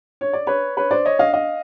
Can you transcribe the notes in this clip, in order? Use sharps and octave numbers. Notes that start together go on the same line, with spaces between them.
C#5
D5
B4 C#5
B4 C#5
C5 D5
C#5 D#5
D#5 F5
D#5 F5